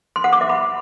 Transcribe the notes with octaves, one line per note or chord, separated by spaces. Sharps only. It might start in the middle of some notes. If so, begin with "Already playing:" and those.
C6
F#5
D6
E5
B5